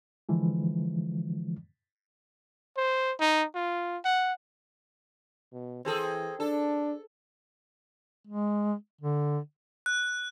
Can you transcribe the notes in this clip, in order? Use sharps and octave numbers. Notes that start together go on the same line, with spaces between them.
D3 E3 F3 G#3
C5
D#4
F4
F#5
B2
E3 C4 G#4 A4
D4 A4
G#3
D3
F#6